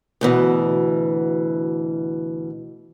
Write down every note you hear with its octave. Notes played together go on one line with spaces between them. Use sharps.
D2 B2 E3